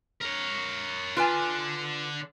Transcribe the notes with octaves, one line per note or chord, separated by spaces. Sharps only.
A#4 C#5
D3 D4 F4 B4 G#5